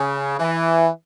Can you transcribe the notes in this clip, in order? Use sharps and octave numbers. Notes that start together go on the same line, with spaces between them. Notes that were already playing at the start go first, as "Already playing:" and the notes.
Already playing: C#3
E3